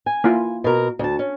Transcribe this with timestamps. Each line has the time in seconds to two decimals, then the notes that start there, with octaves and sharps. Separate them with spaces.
0.06 G#5
0.24 A#3 E4 F4
0.64 B2 A#4 A#5
0.99 D2 A5
1.19 C#4